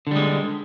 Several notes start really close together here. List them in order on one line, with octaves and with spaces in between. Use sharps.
D3 G3 G#3